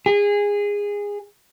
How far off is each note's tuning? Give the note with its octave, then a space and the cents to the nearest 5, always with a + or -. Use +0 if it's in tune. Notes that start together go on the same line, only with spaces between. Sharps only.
G#4 -20